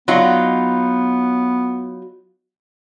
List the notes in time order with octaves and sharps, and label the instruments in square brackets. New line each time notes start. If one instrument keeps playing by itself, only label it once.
[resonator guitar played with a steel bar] F#3 D#4 F4 [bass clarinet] B3